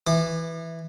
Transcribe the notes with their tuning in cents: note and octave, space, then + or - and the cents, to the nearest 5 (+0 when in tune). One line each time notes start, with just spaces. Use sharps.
E3 +0 D6 +45